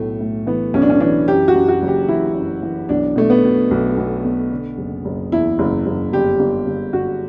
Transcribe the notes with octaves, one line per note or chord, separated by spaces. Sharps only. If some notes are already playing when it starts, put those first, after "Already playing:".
Already playing: B1 A2 A3
A2
E3 B3
B1 C#4
D4
C#4
E3 D4
F#2 G4
F#4
F#2
F#4
F#1
G4
E3 E4
F#2
E3
B1 D4
B2 A3
B3
B2
B1
B1
B2
D3
F#1
F#1
E2 E4
F#1
F#1
G1 G4
G1
G1
G1 F#4